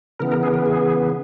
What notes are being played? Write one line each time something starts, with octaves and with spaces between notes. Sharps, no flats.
C#3 E3 B3 A#4
A#4
G#4
A#4
G#4